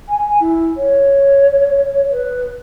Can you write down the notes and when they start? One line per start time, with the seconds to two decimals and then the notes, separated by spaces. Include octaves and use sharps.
0.09 G#5
0.40 E4
0.77 C#5
2.12 B4